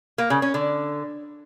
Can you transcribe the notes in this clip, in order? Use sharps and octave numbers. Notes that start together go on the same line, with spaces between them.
A#3
C#3
C#4
D3